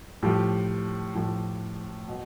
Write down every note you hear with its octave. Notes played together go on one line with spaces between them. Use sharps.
A2 F3 G4
A2 F3
B2